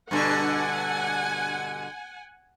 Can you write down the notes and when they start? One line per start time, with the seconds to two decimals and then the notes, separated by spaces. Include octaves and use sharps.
0.11 G2 B2 D3 F#5 G#5